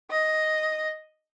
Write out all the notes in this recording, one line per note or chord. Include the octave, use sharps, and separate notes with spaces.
D#5